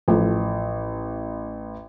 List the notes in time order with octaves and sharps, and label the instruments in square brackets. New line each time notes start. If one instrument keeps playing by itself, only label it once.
[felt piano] A1 [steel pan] F3 A3